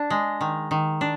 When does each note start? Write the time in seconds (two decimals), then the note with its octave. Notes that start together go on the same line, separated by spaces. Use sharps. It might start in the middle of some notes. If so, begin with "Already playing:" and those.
Already playing: D4
0.10 G#3
0.41 D#3
0.71 D#3
1.01 D4